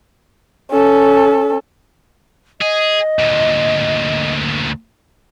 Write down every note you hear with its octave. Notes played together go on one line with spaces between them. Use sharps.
C#4 A4
G#4 D#5
D2 A#2